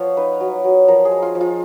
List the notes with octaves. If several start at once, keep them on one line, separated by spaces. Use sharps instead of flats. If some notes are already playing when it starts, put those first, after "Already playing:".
Already playing: F3 B3 C#5 F5
D#4 B4
F#3
F#3
F3 A#4
G#4
G#3
F4
F3
F4